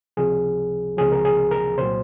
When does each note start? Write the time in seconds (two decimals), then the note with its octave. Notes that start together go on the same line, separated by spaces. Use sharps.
0.17 C#2 C3 F3 G#4
0.97 C#2 C3 F3 G#4
1.12 A#4
1.25 G#4
1.51 A#4
1.78 C2 A#2 F#3 C5